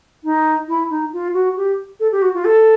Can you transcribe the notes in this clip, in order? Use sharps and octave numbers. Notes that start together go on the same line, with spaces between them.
D#4
E4
D#4
F4
F#4
G4
A4
G4
F#4
F4
A4